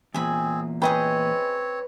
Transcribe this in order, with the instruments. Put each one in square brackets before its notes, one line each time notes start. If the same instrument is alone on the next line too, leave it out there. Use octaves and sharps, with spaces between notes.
[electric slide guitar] E2 A#2 [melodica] C4 G#4 [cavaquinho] G#5 B5
[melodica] C4 C#5 [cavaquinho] G#4 D#5 G5 [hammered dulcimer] B4